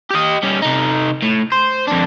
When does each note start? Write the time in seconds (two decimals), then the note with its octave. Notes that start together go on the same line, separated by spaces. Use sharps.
0.10 G4 D#5
0.43 G3 C#4
0.62 C3 D#4
1.23 A2
1.52 C5
1.87 F2 D4